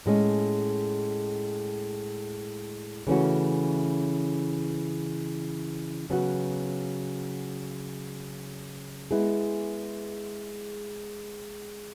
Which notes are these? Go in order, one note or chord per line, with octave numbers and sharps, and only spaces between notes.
A2 G#3 C#4
C#3 E3 A3 C#4 F#4
C#3 F#3 B3 F#4
G#3 B3 E4 G#4